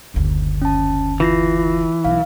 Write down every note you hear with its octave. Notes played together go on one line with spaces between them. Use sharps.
F#1 D2
C#4 A5
E3 F4 A#6 C7
B1 B3 F5